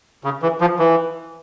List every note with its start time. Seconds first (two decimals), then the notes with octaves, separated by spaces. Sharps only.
0.24 C#3
0.42 E3
0.61 F3
0.79 E3